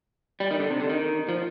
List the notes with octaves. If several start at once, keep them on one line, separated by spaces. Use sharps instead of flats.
G3
D#3
D3
C3
D3
D#3
F3